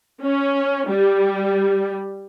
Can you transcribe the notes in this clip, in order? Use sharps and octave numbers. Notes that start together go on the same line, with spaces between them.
C#4
G3